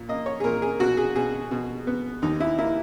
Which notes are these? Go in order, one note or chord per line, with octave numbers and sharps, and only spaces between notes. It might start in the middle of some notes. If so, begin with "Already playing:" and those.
Already playing: A#2
A#3 D#5
C#5
G#4
A#2 A#4
G#4
B2 F#4
G#4
B2 G#4
B2
B3
D#2 D#4
E4
A#3 E4